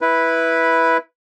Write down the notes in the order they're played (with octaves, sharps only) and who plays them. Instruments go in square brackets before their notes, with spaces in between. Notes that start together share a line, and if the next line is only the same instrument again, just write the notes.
[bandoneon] E4 B4